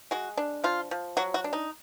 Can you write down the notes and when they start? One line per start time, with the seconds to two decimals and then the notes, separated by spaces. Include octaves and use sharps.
0.11 G#3 F#4
0.37 D4
0.64 F3 F4
0.91 F3
1.17 F#3 F#4
1.34 F#4
1.44 D4
1.53 D#4